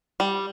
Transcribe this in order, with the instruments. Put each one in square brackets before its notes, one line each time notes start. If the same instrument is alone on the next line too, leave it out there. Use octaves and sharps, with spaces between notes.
[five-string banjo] G3